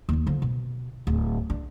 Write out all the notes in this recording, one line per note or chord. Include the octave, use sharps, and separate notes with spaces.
D#2 D#4
D3 F3
B2
D1
D4